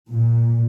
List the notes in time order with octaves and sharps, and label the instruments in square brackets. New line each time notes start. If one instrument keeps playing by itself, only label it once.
[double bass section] A#2